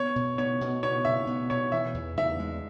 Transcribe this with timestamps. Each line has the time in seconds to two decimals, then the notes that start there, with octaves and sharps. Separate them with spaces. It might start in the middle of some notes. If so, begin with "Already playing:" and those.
Already playing: B3 C#5
0.16 B2
0.38 B3 C#5
0.61 B2
0.83 B3 C#5
1.05 B2 E5
1.27 B3
1.50 B2 C#5
1.72 E3 E5
1.94 E2
2.17 E2 E5
2.39 G#3